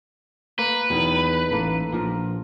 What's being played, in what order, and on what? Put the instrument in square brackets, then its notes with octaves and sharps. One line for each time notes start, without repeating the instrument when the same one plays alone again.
[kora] A#3 [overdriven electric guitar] B4
[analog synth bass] E2 [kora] B2 D#3 F#3
[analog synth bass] A1 [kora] A#3 A4
[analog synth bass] A#1 [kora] A#2 F3 A#4